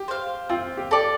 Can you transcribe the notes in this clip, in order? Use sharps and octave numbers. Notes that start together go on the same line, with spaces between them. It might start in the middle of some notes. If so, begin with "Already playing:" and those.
Already playing: G4
C5 F5
C4 F4
G4
A4 D5